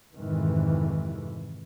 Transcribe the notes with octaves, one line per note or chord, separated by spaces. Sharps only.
F2 G#2 C3 D#3 E3